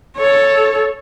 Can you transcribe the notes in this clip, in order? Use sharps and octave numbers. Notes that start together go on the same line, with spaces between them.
A4 C#5